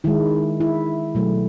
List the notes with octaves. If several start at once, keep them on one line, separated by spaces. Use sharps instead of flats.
D#3 G#3 E4
E4
B2 F#3 A3